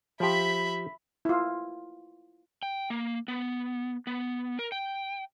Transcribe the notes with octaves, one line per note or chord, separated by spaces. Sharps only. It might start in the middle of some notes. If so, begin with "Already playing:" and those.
F3 G4 E5 B5
E4 F4
G5
A#3
B3
B3
A#4
G5